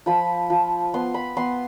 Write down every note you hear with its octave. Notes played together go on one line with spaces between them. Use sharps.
F3 B5
F3
B3 C6
B5
B3 C6